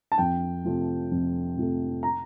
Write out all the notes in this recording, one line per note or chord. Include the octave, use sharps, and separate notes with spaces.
A5
F2 G5
C3 F3 A3
F2
C3 F3 A3
A#5